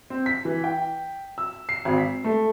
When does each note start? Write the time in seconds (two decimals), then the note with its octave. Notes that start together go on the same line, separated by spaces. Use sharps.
0.10 C4
0.26 B6
0.45 E3
0.64 G5
1.38 E6
1.69 C7
1.85 G#1
1.98 B6
2.24 A3